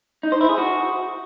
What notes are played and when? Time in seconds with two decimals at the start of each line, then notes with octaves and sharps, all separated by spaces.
0.23 D#4
0.32 C5
0.41 E4
0.49 G#4
0.58 F#4